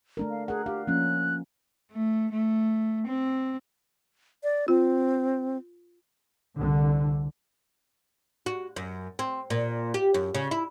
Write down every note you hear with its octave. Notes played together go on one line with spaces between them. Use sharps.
A3 D4 A#4
F5
G#4 A#4 F#5
D4 G4 F5
F3 A#3 C#4 F#6
A3
A3
C4
D5
C4 F4
C2 D3
F#4
F#2
C4
A#2
G4
F#2
C#3
E4